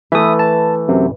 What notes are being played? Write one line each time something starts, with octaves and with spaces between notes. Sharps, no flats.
E3 A3 B4 E5 D#6
A5
F#2 C3